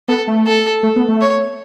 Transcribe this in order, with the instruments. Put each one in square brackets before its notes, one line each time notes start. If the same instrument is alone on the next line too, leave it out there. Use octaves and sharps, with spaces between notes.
[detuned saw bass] B3 [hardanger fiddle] A4
[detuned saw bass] A3
[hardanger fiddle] A4
[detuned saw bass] A3
B3
A3
[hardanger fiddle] C#5